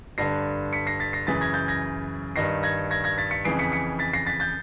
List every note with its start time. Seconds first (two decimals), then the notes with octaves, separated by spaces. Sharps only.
0.18 G2 D3 A#6 C7
0.73 B6 C#7
0.87 A#6 C7
1.00 A6 B6
1.13 A#6 C7
1.27 F#2 C#3 E3 A6 B6
1.41 G#6 A#6
1.54 G6 A6
1.68 G#6 A#6
2.36 G2 D#3 A#6 C7
2.63 G#6 A#6
2.91 G#6 A#6
3.04 G#6 A#6
3.18 A6 B6
3.31 B6 C#7
3.45 F2 C#3 E3 C7 D7
3.59 B6 C#7
3.72 B6 C#7
3.99 A6 B6
4.13 A#6 C7
4.27 A6 B6
4.40 G6 A6